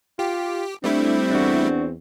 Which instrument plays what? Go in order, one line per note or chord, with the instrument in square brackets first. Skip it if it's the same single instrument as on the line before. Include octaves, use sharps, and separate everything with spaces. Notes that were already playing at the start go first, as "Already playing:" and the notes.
[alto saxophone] F4 [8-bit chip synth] G4
[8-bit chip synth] G3 A3 E4 [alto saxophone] C4 [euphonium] D4
[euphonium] E2 [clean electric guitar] D4 F#4